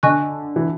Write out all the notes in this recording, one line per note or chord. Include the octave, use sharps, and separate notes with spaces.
D3 D#5 G#5 C#6 F#6
E3